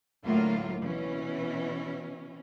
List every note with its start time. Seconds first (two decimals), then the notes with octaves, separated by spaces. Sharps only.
0.24 D2 A2 F#3 A#3 F4
0.80 B2 E3 C#4